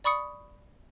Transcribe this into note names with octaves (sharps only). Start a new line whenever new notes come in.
D5 B5 C#6 D#6 C#7